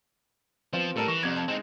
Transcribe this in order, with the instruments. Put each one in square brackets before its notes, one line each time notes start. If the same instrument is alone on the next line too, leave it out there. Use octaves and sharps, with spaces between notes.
[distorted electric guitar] F3 [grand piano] B3 C4 F4
[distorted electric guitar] A2 [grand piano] G3 A4 A#4
[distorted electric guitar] E3 [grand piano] C#6 A#6
[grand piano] C2 G#6 [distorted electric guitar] F2
[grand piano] A5
[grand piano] G#3 [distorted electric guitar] C4 D#4